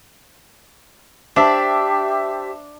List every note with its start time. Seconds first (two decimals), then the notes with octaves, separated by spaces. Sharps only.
1.36 D4 G4 C5 E5 A5